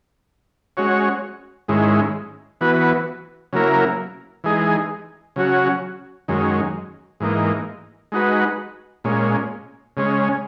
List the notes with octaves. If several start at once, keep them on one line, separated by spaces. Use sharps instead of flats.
G#3 C#4 F#4 C#5
G#2 D#3 G#3 C#4 E4
E3 B3 F#4 B4
C#3 F#3 A#3 E4 A#4
E3 G#3 D#4 G#4
C#3 F#3 C#4 F#4
F#2 D#3 G#3 C#4
G#2 E3 A#3 D#4
G#3 D#4 F#4 B4
A#2 G#3 C#4
C#3 G#3 C#4